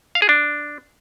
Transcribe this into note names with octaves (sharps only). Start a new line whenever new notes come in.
F5
G#4
D4